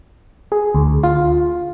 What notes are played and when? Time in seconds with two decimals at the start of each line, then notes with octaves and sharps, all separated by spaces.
0.52 G#4
0.75 D2
1.03 F4